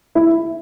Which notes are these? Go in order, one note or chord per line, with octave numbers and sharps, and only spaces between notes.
E4